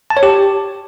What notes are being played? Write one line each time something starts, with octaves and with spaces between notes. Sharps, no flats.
A5
C#5
G4